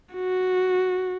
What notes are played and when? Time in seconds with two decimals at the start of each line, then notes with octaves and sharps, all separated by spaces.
0.14 F#4